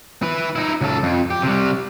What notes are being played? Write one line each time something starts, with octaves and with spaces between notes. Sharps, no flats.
E4 B4
D#4 E4
C#2 A4
F2
G4
C3 G3